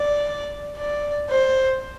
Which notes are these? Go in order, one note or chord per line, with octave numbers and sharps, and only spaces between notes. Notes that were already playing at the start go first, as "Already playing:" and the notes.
Already playing: D5
D5
C5